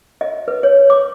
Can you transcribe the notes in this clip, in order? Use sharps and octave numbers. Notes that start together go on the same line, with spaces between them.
D#5
B4
C#5
D6